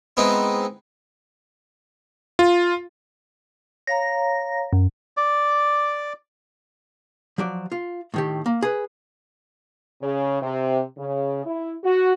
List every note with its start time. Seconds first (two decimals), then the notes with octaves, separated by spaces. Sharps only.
0.17 G#3 B3 C4 D#4 E4
2.39 F4
3.87 C#5 F5 A#5 A#6
4.73 F#2
5.17 D5 D6
7.38 F3 F#3 D5
7.72 F4
8.14 A2 D#3 G4
8.46 A#3
8.62 G#4 B4
10.02 C#3
10.42 C3
10.97 C#3
11.45 E4
11.84 F#4